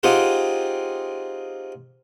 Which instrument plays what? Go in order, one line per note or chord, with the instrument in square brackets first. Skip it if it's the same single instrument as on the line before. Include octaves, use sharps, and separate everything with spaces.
[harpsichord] C4 D#4 F4 G4 G#4 F#5